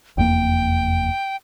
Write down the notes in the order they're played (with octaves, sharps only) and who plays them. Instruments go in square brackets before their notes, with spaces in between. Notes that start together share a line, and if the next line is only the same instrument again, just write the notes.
[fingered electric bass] F1 E2 A#3 [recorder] G5